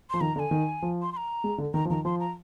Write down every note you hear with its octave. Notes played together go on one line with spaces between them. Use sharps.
F3 C6
D#3 A#5
D3 A#5
G#5
D#3
F3
C6
C6
A#5
G#3
D3
D#3 A#5
F3
D#3 A#5
F3 C6
A#5